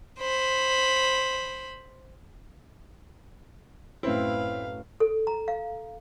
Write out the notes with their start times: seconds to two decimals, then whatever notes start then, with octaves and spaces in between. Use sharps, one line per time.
0.19 C5 B5
4.03 F#2 A2 C4 E4 B4 F5
5.00 A4
5.27 A#5
5.48 F5